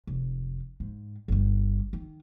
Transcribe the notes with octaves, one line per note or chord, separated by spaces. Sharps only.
F1
G#2
G1 G3
D#3